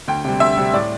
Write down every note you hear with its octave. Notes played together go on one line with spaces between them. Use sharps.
D2 G5
C3 G3
D2 E5
C3 G3
A2 D5